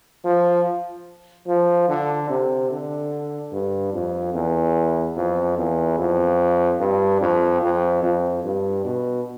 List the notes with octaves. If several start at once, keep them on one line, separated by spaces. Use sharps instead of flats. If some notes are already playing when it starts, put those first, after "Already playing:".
F3
F3
D3
C3
D3
G2
F2
E2
F2
E2
F2
G2
F2
F2
F2
G2
B2